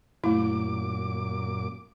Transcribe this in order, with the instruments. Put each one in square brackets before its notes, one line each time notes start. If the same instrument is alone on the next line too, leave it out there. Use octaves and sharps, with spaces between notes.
[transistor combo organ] F#2 A#2 D6 [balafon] A3 E4